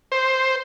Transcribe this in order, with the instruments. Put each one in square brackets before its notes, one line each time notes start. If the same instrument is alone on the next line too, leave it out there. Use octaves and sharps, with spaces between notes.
[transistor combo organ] C5